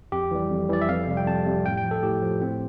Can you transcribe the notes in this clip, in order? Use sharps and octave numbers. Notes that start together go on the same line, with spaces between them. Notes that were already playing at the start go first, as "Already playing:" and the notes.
F2 G4
E3 G3
F2
E3 G3 D5
E5
F2 F5
C3 G3
G5
F2 A5
C3 G3
A2 G5
G5
F3
A4
A2 G4
F3
A2 C4